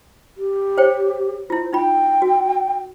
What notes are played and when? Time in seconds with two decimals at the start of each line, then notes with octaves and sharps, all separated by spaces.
0.37 G4
0.78 C5 C#5 G5
1.50 E4 F4 C5
1.73 D#4 F4 G5 B5
2.22 F#4